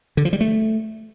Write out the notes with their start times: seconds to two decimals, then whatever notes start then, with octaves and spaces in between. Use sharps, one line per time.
0.17 D3
0.25 F3
0.33 G3
0.40 A3